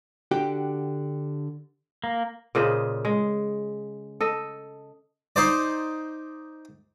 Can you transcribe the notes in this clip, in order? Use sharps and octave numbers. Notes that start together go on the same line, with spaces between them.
D3 F#4 G4 G5
A#3
A#2 C#3 C5 D#5
G#3
A4 D#5
D#4 C5 D5